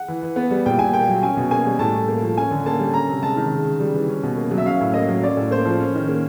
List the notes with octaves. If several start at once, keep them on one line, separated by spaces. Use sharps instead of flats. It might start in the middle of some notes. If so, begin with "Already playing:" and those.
Already playing: F#5
E3
E3
B3
G3
A#2 G5
A#2 G#5
A#3 G5
F#3
C#4 G#5
B2
A#3 G#5
G3
A2 A5
A2
A#3
F3
C#4 G#5
D3
A#3 A5
G3
C#4 A#5
C3
G#3 A5
D#3
C#3
C#3
G3
E3
C#4
B2
A#3
F#3
E5
C#4 F5
A2
A#3 D#5
F#3
C#4 D5
A2
A#3 C5
F3
C#4
D#3
A#3